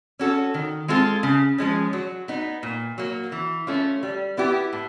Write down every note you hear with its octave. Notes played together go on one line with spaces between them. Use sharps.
C#4 F#4 A4
D#3
G#3 C4 F4 A4
C#3
F3 G#3 C#4
F#3
B3 D#4
A#2
F#3 A#3
E3
A3 C#4 F4
G3
B3 E4 G4
A2